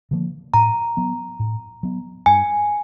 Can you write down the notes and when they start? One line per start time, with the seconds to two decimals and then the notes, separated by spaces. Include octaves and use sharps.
0.11 D3 F3 A#3
0.54 A2 A#5
0.97 F#3 B3
1.39 A2
1.83 F#3 B3
2.26 G2 G#5